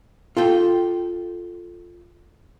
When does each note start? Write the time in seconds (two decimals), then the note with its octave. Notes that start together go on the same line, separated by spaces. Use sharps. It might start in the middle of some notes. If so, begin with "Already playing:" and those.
0.37 F4 A4 G5